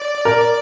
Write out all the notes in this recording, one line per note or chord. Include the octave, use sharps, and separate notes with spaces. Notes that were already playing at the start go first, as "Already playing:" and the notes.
Already playing: D5
A#4